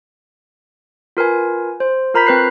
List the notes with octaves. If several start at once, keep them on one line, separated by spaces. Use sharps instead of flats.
F4 A#4 B4 G#5
C5
F4 A#4 A#5 B5 G6 B6
C4 B4 F#6 C7